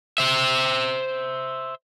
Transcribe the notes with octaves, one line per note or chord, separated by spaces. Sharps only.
C5 E5